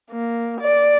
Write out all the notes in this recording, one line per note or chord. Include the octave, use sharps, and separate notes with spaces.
A#3
D5